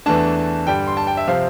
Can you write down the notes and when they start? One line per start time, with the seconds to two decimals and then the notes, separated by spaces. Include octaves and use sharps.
0.06 E2 E3 A3 D4 A5
0.67 G2 D3 G3 G5
0.87 C6
0.97 A5
1.07 G5
1.17 E5
1.28 C3 F3 C4 F5